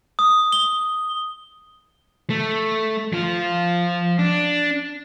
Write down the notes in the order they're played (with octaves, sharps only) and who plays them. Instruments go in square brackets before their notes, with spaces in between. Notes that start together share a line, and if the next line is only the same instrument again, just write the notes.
[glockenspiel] D#6
G7
[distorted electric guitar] A3
F3 F4
D4